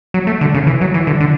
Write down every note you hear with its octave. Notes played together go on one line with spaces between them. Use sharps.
F#3
A3
D3
C#3
E3
F#3
E3
D3
D3